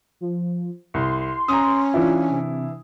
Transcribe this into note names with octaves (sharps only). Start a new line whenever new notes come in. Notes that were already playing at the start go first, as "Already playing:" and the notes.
F3
C2 C6
C#4 A#5 D#6
E3 D4 E4 F4
C3